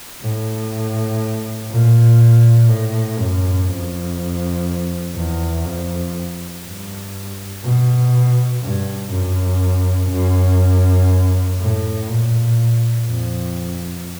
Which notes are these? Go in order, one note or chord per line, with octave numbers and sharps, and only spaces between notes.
A2
A#2
A2
F#2
F2
E2
F2
G2
B2
G2
F#2
F#2
A2
A#2
F2